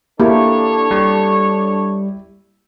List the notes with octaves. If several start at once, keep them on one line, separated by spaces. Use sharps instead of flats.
A#3 D4 E4 G4 A4 C#5
G3